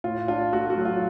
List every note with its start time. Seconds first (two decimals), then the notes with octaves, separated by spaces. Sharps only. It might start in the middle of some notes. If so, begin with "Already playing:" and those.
0.04 A2 F4
0.28 D4 F4
0.53 A3 F#4
0.70 F#4
0.78 F#3
0.85 F4